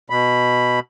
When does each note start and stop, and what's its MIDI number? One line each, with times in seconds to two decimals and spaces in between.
0.10 0.80 47
0.10 0.80 83